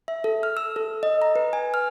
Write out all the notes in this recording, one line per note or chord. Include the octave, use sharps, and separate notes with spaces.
E5
A4
F6
E6
A4
D#5
A#5
B4
G#5
F6